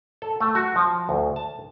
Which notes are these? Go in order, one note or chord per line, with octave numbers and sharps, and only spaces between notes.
A4
A3
F#4
F3
D2
A5